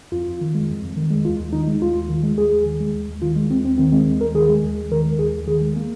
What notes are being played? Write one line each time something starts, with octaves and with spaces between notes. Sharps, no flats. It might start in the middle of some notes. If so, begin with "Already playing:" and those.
F2 F4
F2
D#3
G#3
F2
F2
D#3
G#3
D#2 F4
D#2
D#3 D#4
G#3
D#2 F4
D#2
D#3
G#3
D#2 G#4
D#2
D#3
G#3
D#2
D#2
D#3 F4
G#3
D#2 C4
D#2 C4
D#3 C4
G#3 C4
D#2 C4
D#2 A#4
D#3 G#4
G#3
D#2
D#2
D#3 A#4
G#3
D#2 G#4
D#2
D#3 G#4
G#3
A#3